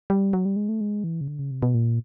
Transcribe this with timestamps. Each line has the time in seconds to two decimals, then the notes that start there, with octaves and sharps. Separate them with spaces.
0.10 G3
0.33 F#3
0.45 G3
0.56 G#3
0.69 A3
0.81 G#3
1.04 E3
1.21 C#3
1.28 D3
1.39 C#3
1.51 C3
1.62 B2
1.74 A#2